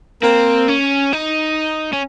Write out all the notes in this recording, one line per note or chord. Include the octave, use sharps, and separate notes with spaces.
A#3 C4
C#4
D#4
C#4